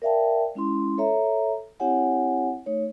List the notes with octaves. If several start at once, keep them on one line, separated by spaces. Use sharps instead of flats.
A#4 D5 E5 F5 G5 A5
G#3 C#4 E4 C6
A4 C#5 E5 A#5
C4 E4 G4 C#5 F#5 G#5
A3 D#4 C#5